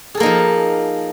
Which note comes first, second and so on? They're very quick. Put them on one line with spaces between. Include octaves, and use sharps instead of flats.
G#4 A4 A#3 D#4 F3